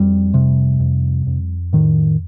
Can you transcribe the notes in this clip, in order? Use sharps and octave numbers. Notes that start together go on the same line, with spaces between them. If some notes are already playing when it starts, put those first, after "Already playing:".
Already playing: F2 G3
C3
F2
F2
A2 D#3